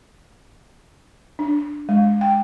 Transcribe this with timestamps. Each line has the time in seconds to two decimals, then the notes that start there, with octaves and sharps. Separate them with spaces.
1.39 D4
1.89 G#3
2.21 G5